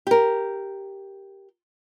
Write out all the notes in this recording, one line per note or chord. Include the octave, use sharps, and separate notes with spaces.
G4 A#4